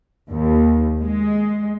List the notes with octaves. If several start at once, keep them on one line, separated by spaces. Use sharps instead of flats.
D#2
G#3